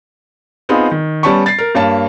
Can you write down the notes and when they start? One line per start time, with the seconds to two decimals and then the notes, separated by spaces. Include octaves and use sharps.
0.69 B3 C4 D#4 F4 G#4
0.91 D#3
1.23 G3 B3 C#4 A5 B5 C#6
1.46 A6 C7
1.58 A#4
1.75 G2 A#3 C#5 A5